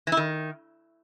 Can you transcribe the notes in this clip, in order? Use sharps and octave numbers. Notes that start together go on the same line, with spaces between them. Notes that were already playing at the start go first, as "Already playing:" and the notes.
E3
E4
D#3